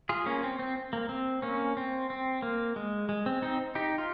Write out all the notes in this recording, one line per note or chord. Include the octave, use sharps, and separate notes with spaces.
F4 G#4
A#3 C#4
C4
C4
A#3
C4
A#3 C#4
C4
C4
A#3
G#3
G#3
C4
C4 D#4
D#4 G4
F4